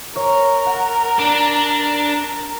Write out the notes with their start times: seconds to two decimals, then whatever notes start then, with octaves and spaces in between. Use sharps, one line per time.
0.16 A#4 C#5
0.66 F#5
1.19 D4 D5